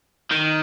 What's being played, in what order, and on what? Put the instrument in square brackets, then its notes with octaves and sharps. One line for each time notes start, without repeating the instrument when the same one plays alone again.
[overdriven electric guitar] D#3